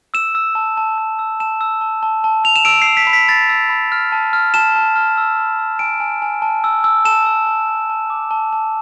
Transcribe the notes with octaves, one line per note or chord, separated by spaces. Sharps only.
E6 E7
E6
A5
A5
E6
E6
A5 E7
E6
A5
A5
A5
A5 F7
E7
E6 D7
C7
E6
B6
B5
B6
B5 A6
E6
B5
F6
A5
F6
A5 E7
A5
F6
E6
B5
E6
G#5 D7
G#5
G#5
A5
E6
E6
A5 E7
E6
A5
A5
A5
D6
A5
A5